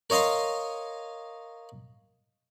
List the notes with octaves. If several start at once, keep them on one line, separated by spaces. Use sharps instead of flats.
A#4 C#5 D#5 F5 C6